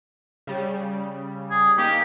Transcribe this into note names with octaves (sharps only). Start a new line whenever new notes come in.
C#3 G3
G#4
A#3 D#4 G4 A#4